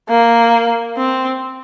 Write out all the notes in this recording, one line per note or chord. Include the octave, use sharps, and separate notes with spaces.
A#3
C4